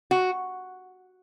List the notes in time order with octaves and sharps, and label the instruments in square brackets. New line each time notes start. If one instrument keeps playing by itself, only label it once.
[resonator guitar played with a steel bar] F#4